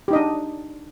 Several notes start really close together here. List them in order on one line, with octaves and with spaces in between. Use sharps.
G4 D#4 D#5 D4